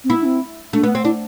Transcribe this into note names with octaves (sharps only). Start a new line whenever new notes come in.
C4
B3 E4
D4
C4
A3 D4
B3
C4
D4 E4